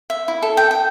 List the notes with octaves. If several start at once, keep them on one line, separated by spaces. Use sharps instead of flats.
E5
E4
A4
G5
G5